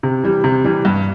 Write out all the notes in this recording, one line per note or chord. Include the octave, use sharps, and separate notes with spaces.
C3
E3 G3
C3
E3 G3
G2